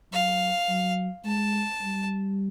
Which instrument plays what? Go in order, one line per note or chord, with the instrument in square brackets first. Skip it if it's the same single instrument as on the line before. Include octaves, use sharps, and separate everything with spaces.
[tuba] F#3 [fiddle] F5
[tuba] F#3
[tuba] G#3 [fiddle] A5
[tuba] G3